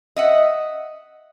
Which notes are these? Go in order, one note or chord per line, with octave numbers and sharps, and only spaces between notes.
D#5 E5 F#5